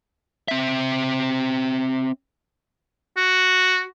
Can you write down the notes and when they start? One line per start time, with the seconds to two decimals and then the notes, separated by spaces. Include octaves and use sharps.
0.48 C4 E5
3.17 F#4